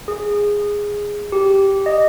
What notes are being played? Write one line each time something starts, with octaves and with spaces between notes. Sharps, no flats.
G#4
G4
D#5